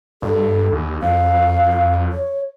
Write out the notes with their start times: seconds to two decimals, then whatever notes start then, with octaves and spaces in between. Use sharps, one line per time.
0.22 G2 A4
0.72 D#2
1.02 F2 F5
2.12 C#5